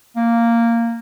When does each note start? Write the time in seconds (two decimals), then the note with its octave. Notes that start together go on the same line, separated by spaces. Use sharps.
0.16 A#3